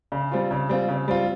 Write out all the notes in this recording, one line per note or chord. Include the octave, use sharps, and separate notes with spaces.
C#3
G3 C4 F4
C#3
G3 C4 F4
C#3
G3 C4 F4